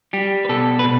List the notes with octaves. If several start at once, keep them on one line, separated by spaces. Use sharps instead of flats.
G3 G4
B4
B2 A4
B4
B2